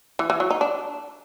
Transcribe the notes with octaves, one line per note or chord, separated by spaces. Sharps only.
E3
E3
F#3
D#4
D4